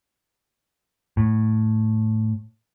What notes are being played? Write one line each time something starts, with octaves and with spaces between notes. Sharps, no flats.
A2